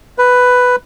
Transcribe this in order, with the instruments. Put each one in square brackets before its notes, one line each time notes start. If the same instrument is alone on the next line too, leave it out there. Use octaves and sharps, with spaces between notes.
[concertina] B4